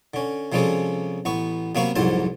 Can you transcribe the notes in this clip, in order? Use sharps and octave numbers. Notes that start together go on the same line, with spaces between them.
D3 C#4
C3 F3 G3 G#3 C#4 A4
A1 B3 C#6
C3 F#3 A#3 B3 F5 C#6
C2 F2 G#2 F#3 C5 A5